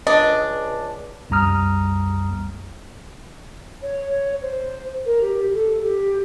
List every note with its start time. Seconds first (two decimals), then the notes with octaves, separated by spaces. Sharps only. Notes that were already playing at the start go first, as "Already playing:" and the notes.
0.07 C#2 D4 D#5
1.30 C2 F#2 G3 A#5 D#6 F6
3.81 C#5
4.42 C5
5.05 A#4
5.21 G4
5.54 A4
5.83 G4